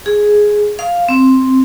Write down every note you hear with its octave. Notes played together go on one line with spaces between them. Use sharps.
G#4
F5
C4